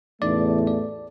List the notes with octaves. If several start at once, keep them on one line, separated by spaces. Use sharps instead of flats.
A1 E2 A3 D#4 D5
D5